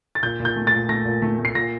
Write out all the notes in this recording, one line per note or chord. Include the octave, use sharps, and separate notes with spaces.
A6
A#2 G6
A#2
G6
A3
A6
A#2
A3 A#6
A#2
A3
A3
C7
A#2 A#6